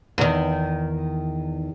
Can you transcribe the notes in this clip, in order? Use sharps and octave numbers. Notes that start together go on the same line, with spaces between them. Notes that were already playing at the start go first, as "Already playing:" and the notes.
E2 D#3